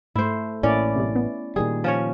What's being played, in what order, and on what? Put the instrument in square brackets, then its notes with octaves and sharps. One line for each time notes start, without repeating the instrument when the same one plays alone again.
[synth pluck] G#2 [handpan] A3 [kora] E4 C5
[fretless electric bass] A1 A2 A#3 [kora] C#4 [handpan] E4 D5
[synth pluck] C3 G3
B3
[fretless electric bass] A#2 D#3 G3 [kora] G#4
[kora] F3 C#4 C#5